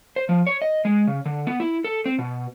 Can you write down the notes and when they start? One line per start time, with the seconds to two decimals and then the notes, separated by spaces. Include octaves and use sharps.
0.16 C5
0.29 F3
0.47 C#5
0.62 D#5
0.85 G#3
1.07 C#3
1.26 D3
1.47 B3
1.60 E4
1.84 A4
2.06 C4
2.19 B2